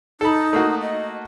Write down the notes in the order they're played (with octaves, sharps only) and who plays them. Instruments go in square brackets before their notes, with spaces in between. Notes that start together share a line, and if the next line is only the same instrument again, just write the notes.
[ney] D#4 [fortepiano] A4 B5
[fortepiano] A3 A#3 F#4
[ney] D#5